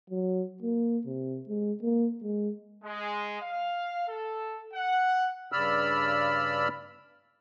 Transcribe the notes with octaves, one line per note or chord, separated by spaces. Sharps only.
F#3
A#3
C3
G#3
A#3
G#3
G#3
F5
A4
F#5
G2 C#3 D5 B5 E6 F6